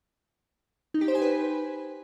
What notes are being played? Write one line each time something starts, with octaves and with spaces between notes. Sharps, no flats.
D#4
G4
C5
G#5
B4